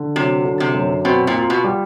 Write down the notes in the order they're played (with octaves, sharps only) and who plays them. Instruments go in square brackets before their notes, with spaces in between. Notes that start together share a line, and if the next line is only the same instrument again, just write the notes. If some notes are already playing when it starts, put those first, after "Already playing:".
Already playing: [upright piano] D3
[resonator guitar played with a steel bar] C3 [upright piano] F#3
[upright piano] D3
[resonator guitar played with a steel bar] C3
[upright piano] F#2
[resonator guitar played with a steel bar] B2 [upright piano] C4
[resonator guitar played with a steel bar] A#2
[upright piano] F4
[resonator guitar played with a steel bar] B2
[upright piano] G3